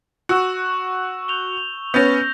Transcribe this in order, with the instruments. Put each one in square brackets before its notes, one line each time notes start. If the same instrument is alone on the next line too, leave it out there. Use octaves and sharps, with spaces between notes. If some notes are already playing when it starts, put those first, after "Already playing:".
[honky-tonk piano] F#4 [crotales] C#6 E6 E7
[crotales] G6 F7 G7
[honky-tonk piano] B3 C#4 [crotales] G6 A#6